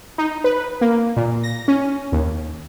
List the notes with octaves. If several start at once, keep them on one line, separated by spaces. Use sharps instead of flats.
D#4
B4
A#3
A#2
A#6
C#4
D#2